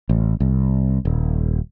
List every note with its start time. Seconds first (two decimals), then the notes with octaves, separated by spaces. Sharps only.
0.09 A1
0.40 C2
1.05 D#1